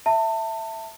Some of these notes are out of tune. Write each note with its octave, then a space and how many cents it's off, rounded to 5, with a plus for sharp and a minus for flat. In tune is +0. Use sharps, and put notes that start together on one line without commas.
E5 +0 A5 +30